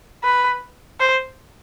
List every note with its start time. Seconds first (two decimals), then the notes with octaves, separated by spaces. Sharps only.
0.24 B4
1.00 C5